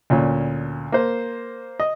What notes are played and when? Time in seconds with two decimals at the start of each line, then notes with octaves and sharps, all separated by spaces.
0.10 D2 A#2 C#4
0.92 A#3 C5
1.80 D#5